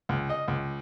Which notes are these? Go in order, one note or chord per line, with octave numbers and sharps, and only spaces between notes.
C#2
D#5
C#2